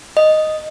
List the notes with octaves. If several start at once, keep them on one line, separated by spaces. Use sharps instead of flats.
D#5